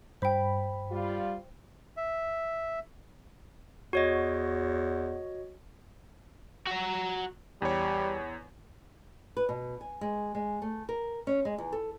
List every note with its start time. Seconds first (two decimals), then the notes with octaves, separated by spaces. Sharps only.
0.22 G2 C5 G5 B5
0.91 G3 F4
1.97 E5
3.93 E2 F#4 C#5 D#5
6.67 F#4 A#5
7.62 E2 G3 C#5
9.37 B4
9.49 B2
9.81 G#5
10.01 G#3
10.35 G#3
10.62 A3
10.89 A#4
11.27 C#4
11.45 G#3
11.58 E2
11.72 A4